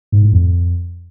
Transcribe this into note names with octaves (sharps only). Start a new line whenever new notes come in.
G#2
A2
F2